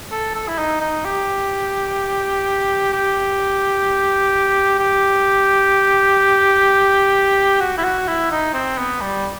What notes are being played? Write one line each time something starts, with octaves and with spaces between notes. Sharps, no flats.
A4
A4
E4
D#4
D#4
G4
G4
G4
F#4
E4
F#4
E4
D#4
C4
B3
G3